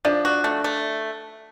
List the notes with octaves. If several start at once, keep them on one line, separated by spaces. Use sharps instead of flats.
F3 D4
F#4
A3
A3